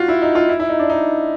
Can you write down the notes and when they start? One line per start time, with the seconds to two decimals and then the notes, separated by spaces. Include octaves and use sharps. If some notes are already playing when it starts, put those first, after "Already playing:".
Already playing: F4 F#4
0.08 E4
0.22 D#4
0.35 F4
0.49 E4
0.60 E4
0.69 D#4
0.79 D4
0.90 D#4